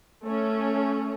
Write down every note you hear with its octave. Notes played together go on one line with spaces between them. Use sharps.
A3 C#4